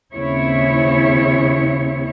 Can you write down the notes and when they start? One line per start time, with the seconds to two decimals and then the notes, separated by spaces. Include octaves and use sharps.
0.14 D#2 C#3 C4 E4 C#5